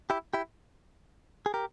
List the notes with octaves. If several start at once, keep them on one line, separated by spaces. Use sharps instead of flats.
E4 G4
E4 G4
G#4
G4 A#4